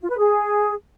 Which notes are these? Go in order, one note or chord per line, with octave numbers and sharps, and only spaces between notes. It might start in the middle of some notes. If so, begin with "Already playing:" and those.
F4
B4
G#4